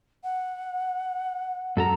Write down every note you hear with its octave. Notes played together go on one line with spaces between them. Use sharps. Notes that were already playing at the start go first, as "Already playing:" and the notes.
F#5
F#2 A4 A#5